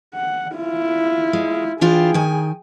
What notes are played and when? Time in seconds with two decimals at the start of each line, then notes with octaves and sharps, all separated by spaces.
0.15 F#5
0.55 E4 F4
1.33 G#3
1.81 E3 D4 F4 G#4 G5
2.14 D#3 G#5